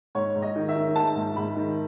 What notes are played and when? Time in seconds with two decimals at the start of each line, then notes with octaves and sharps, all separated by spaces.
0.15 G#2 C#5
0.35 G#2
0.42 D#5
0.56 D#3
0.69 E5
0.76 D#3
0.96 D#3 A5
1.16 G#2
1.36 G#2 B5
1.56 D#3